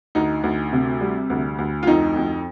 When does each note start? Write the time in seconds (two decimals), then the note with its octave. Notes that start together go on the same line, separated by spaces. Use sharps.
0.15 D2 D#4
0.44 D2
0.73 C3
1.01 G3
1.30 D2
1.58 D2
1.83 F4
1.87 F2 D#4
2.16 F2